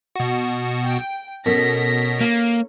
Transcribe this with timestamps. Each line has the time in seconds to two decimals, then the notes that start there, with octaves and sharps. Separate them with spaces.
0.16 B2 F#4
0.82 G5
1.46 B2 C#4 A4 A#4 A#6 B6
2.21 A#3